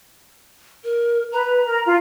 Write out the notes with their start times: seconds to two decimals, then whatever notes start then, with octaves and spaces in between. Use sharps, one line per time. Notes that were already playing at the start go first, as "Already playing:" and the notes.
0.84 A#4
1.32 B4 A#5
1.65 A#4
1.87 F4